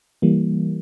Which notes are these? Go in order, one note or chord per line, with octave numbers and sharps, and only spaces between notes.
E3 G3 A#3